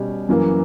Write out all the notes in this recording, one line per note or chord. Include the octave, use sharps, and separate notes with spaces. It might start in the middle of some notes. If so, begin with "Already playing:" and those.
Already playing: B2 G3 C#4 G4
F#2 E3 A#3